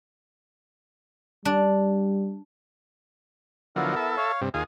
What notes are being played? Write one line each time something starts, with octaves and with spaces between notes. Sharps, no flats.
G3 D4
D3 F3 F#3 B3 E4 A#4
A4 E5
C#5 F5
G2 C3
D#2 F4 G#4 D#6